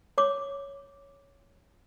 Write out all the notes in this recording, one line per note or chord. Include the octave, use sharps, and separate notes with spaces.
C#5 D6